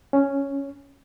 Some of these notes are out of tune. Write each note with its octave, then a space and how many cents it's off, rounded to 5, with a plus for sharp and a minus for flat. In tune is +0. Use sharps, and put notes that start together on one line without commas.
C#4 +0 C#5 +0